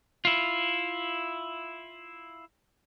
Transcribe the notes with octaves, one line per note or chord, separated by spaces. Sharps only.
E4 F4